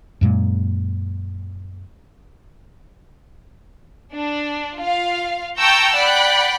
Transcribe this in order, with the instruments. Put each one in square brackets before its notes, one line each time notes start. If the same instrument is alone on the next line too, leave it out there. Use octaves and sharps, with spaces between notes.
[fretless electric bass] F#2 A#2 G#3
[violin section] D4
F4 F5
G5 A5 A#5 C#6 E6 G6
D5 F#5 G5 B5 F#6